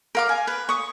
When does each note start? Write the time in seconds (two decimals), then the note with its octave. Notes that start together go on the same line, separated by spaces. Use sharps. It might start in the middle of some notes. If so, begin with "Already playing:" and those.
0.15 A#4 F5 D6
0.29 G#5
0.47 B4
0.69 C#6 D#6